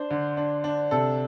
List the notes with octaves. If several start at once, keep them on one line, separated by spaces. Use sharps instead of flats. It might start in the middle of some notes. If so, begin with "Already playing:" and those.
Already playing: D4 C5
D3
D4
D4
C3 A4